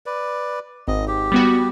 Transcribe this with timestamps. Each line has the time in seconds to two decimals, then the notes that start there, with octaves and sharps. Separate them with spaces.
0.06 B4 D5
0.88 G#1 D#5
1.08 G4
1.32 G3 B3 F#4